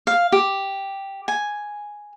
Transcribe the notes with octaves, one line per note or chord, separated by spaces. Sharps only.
F5
G4
G#5